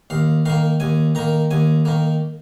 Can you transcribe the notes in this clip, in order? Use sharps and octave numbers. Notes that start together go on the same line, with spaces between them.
D#2 F5
D#3 A#3 F5
D#2 G#5
D#3 A#3 A#5
D#2 G#5
D#3 A#3